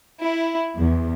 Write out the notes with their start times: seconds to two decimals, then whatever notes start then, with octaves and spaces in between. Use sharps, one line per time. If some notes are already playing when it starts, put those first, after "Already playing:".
0.23 E4
0.77 E2